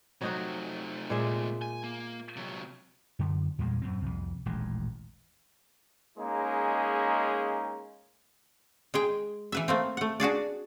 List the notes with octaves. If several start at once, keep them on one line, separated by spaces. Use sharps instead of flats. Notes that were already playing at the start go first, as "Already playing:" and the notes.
C3 F#3 A3 D#4 F#4
A#2 G#3 E5
G#5
A#3
C3 F#3
F#2 D3
E2 A#2 G3 G#3
F#2 A2 C4
C2 F2
D#1 A1 D#2 G#3
G#3 A#3 C#4 D#4 G#4
G#3 G#4 G5
E3 B4 E5
A3 A#3 C4
A3 F#5
D4 F#4 G#4 D5